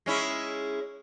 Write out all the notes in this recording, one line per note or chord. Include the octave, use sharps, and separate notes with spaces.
G#3 C#4 E4